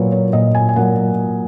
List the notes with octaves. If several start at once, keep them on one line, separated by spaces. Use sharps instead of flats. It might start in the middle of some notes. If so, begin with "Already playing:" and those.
Already playing: A#2 F#3 A#3 B4 C#5
C#5
A#2 D#5
G#5
G#5
F#3 A#3 F#5